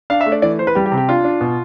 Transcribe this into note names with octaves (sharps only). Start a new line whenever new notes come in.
D4 F5
E5
A3
D5
E3 D5
E3 C5
B4
G3 G4
G4
C3
G4
D4 F4
D4
B2